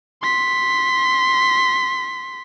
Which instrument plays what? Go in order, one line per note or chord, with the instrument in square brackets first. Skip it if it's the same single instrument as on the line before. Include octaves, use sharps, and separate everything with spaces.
[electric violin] C6 B6